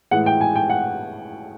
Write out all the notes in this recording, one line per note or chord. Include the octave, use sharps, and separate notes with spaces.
A2 E3 G#3 F#5
G5
G#5
G5
F#5